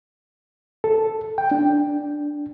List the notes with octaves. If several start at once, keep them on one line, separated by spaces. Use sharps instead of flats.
A4
G5
D4